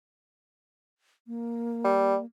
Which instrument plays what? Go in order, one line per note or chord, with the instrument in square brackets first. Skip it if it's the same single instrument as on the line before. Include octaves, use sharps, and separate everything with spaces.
[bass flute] A#3
[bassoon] G3